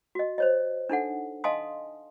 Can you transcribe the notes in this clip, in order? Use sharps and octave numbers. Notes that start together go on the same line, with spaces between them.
F#4 D#5
C5 C#5 D#5
D4 D#4 A4 F#5
D#5 F5 G#5 A5 C6 D#6